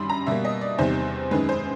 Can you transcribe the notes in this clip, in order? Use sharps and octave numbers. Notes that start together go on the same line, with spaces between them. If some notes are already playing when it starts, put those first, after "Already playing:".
Already playing: F#2 D#3 G3 B5 C6
A#5
B2 G3 A#3 E5
D#5
D5
E2 C3 D#3 G3 C5
F#2 D#3 G#3 B4
C5